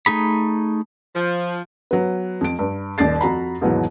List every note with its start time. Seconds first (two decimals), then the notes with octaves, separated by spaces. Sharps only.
0.06 A3 D#4 G#4 B5
1.16 F3
1.91 F#3 B3
2.41 F2 D7
2.59 G2
2.98 D#1 D#2 D5 A6 C7
3.21 F2 F#4 A#5 B5
3.61 D#2 G#2 B2 E3 F#3